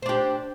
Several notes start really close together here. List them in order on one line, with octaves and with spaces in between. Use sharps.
C5 D4 G4